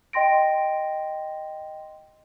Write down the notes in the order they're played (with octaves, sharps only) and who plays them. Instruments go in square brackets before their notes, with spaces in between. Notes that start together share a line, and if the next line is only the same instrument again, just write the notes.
[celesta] D#5 G5 C6 A#6 D7